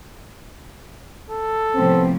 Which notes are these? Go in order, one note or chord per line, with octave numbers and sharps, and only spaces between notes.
A4
A2 C3 F3 B3 C4